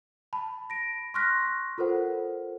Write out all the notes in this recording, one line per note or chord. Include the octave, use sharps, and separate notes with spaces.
A5 B5
A#6 D7
C6 C#6 F6 F#6 A#6 B6
F4 A4 A#4 C5 F#5